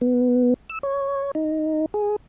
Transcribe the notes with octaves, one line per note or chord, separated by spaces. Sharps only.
B3
E6
C#5
D#4
G#4